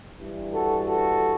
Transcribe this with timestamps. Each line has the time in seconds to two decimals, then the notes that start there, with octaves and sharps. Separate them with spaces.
0.20 G2 E3
0.53 F#4 A4
0.87 F#4 A4